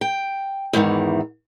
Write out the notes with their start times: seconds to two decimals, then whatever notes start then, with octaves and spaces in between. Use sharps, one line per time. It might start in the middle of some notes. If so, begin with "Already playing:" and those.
0.01 G5
0.73 E2 G#2 D#3 E3